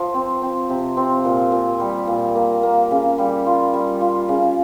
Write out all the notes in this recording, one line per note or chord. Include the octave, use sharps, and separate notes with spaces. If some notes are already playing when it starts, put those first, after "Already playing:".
Already playing: F3
C4
C4
C3
C4
A#2
A#2
G3
A#2
A#3
A#3
C#3
G3
F4
G3
F4
C#3